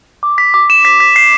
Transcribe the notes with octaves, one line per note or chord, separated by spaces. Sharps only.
D6
B6
D6
E7
B6
B6
C7